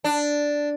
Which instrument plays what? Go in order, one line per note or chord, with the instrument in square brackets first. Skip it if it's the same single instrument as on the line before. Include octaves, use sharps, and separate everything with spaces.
[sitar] D4